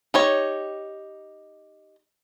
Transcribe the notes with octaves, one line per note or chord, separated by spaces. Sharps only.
D#4 G4 C#5